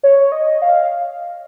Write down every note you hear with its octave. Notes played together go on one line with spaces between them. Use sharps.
C#5
D#5
F5